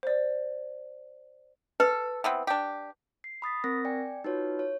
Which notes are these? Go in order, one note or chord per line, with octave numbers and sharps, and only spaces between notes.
C5 D5
A4 B4
E3 B3 C4
D4 G4
C7
B5 D#6 A6 B6
C4 A#4 A#6
D5 G5 G#5
D#4 F4 F#4 B4 C#5
C#5